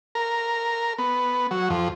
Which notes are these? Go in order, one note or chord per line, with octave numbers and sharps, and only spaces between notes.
A#4
B3
F#3
F2